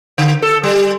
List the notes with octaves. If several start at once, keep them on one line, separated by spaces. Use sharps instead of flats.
D3
A4
G3